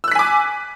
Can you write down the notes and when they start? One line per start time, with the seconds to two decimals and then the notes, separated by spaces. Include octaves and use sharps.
0.04 E6
0.08 F#6
0.12 B6
0.15 G#5
0.19 D6